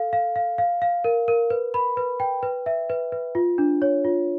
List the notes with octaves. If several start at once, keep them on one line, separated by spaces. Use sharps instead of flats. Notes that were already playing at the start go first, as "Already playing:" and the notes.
Already playing: A4 F5
F5
F5
F5
F5
A#4
A#4
B4
B5
B4
G5
B4
E5
B4
B4
F4
D4
C#5
F4